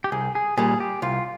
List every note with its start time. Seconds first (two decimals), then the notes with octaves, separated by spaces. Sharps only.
0.04 G4
0.12 C2 G#4
0.35 G#4
0.57 A#2 G3 G#4
0.80 G4
1.02 C2 F4